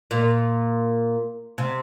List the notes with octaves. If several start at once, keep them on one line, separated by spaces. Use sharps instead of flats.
A#2
C3